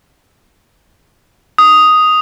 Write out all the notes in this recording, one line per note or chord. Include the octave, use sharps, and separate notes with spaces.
D#6